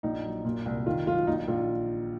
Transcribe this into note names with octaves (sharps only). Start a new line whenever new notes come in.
A#1 D#4
F#3
A#2
C2
D#3 F4
F#3 F4
A#1 D#4
A#1 F4